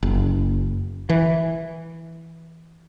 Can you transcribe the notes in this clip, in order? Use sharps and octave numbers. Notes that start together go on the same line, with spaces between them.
F#1
E3